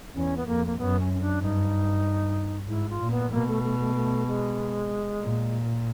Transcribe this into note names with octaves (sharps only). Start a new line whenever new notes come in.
E2 C#4
B3
F2 A#3
A#3
F#2 B3
C#4
C#4
D4
G2 D#4
G#2 E4
F4
A#2
B3
B2 A#3
A3
A3
A3
A3
G#3
A#2